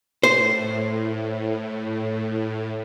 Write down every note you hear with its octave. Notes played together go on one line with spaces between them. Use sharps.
A2 C5